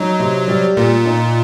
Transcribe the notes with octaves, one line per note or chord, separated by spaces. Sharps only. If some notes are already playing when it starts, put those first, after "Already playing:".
Already playing: F#3 D#4
C3
G3
A#2 A#3
D#4